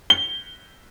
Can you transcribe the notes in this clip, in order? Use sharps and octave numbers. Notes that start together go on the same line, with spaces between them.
G7